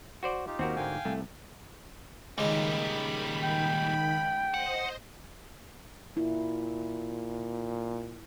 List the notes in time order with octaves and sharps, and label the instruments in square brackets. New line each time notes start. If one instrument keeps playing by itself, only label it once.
[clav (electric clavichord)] F#4 C5 D5
[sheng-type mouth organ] D#4 F4 G4
[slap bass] D#2 [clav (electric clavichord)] C4 F#4 A#4
[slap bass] G#2 D3 [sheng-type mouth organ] F5 G5 G#5
[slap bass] C2 [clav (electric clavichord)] A3
[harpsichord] C#2 G#3 [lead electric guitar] A#2 G3 [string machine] D#3 B5
[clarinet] G5
[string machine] C5 D#5 [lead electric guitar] F#5
[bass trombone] A#2 [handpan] E4